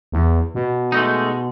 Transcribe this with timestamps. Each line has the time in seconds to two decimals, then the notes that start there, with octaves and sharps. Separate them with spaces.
0.12 E2
0.55 B2
0.92 G#3 A3 D#4